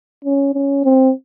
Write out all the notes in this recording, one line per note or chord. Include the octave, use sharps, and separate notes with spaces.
C#4
C#4
C4